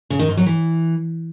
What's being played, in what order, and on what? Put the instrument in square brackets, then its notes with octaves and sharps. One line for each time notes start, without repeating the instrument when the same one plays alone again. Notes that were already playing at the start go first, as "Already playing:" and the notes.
[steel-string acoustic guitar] C#3
D#3
G#2
F#3
E3